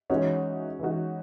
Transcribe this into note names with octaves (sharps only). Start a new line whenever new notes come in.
E3 G#3 C#4 D#4 F#4
E3 G#3 D#4 F#4